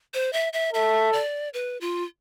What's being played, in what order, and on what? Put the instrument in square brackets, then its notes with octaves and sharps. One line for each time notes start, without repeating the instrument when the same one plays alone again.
[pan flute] C5
E5
E5
[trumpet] A4 [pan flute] E5
[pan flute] D5
B4
F4